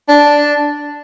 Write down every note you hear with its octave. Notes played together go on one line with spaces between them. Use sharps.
D4